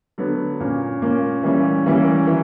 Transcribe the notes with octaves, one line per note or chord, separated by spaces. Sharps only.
D3 F#3 B3
A#2 A#3 C#4
A#2 A#3 C#4
E3 G3 A#3 C#4
E3 G3 A#3 C#4
E3